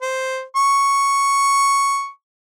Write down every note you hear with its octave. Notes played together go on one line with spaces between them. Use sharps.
C5
C#6